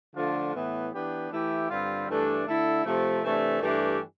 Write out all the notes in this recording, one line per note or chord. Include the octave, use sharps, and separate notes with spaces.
D3 F3 A3 D4 F4
A2 E3 B3
E3 B3 D4 G4
E3 A3 E4 G4
G2 D3 G3 C4 F4
G2 E3 A3 D4 A4
D3 A3 E4 A4
C3 F3 A3
C3 E3 A3 D4
G2 E3 A3 D4 G4